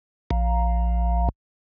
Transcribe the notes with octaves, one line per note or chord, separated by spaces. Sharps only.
A#1